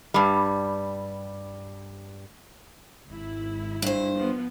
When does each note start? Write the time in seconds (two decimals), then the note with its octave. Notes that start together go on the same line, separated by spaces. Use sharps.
0.14 G2 G3
3.08 G#1 E4
3.82 G2 C5
4.14 F3 B3